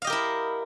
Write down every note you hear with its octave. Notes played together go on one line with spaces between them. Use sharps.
E4 G4 A#4 D#5 F5